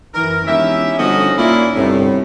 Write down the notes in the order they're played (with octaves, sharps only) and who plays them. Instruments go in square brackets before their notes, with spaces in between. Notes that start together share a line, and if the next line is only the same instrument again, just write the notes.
[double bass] F#2 E3 [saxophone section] A#4
[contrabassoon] E1 [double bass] D#3 C#4 [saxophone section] E4 G4 E5
[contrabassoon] G1 [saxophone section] F2 F#4 D#5
[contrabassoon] A#2 [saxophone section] A#3 D4 E4
[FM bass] G1 [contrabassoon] C2 [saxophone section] A2